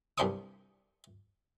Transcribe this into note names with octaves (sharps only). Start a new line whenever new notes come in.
C2 G2 D4 C5 C#6 D#6